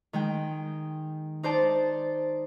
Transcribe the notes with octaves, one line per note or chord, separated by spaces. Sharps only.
D#3 G#3 G5
D#4 C5 D5 A5